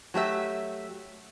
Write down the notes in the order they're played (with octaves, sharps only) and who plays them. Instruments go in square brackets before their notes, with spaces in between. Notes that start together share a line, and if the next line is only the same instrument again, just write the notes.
[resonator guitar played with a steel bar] F#3 A3 G4 E5